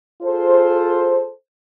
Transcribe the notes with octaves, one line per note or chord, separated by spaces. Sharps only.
F4 G#4 A4 C5